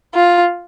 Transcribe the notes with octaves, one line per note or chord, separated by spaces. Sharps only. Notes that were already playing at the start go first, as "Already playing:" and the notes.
F4